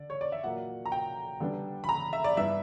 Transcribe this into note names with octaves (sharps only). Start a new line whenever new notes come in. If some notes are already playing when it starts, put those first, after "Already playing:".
Already playing: D3 D5
C#5
D5
E5
A#2 F#3 A#3 F#5
A#5
G5
D3 G3 B3 D4
B5
A#5
E5
D5
G2 E3 B3 E4 E5